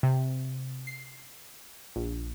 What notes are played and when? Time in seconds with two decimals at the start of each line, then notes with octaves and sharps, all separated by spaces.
0.03 C3
0.87 C7
1.96 A#1